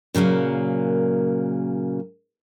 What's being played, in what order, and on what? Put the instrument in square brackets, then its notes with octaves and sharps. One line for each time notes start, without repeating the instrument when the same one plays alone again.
[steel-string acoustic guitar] A#2 C#3 F#3 A#3